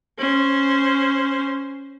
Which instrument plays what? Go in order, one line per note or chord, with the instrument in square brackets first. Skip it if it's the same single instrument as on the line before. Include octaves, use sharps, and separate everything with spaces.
[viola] C#4 C5